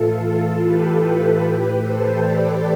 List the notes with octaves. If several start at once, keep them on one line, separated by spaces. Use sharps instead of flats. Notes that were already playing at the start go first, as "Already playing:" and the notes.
Already playing: A2 E3 F4 A4
F4 A4
G4 B4
F4 A4
A2 E3 G4 B4
A4 C5
B4 D5